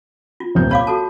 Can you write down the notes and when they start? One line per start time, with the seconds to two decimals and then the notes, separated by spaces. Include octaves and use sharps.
0.40 F4
0.55 D#1 C2 G6
0.71 C#5 F5 B5 D6
0.87 F#4 A4 A5